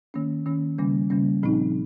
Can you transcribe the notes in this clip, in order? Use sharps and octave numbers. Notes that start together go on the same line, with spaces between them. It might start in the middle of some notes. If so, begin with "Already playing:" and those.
D#3 A#3 C#4
D#3 A#3 C#4
C#3 G3 A#3 C#4
C#3 G3 A#3 C#4
A#2 F3 C4 D#4